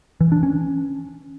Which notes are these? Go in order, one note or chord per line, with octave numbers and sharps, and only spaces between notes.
E3
D4
C#4